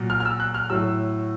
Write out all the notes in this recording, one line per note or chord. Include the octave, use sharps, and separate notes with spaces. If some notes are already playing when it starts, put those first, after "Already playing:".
Already playing: A#2 F#3
F6
F6
E6
F#6
F6
A2 F#3 E6